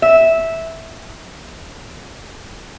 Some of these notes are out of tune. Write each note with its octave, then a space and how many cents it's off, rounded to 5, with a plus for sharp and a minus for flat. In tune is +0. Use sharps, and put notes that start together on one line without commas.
E5 -10